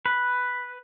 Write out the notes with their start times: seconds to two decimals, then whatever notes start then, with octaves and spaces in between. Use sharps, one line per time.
0.06 B4